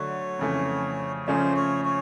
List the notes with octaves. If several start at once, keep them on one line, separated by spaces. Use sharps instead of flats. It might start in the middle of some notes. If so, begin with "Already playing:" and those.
Already playing: D3 F#3 A3 C#5
F2 C#3 E3 A3
C#3 F3 A3 C#4 C5
C#5
C#5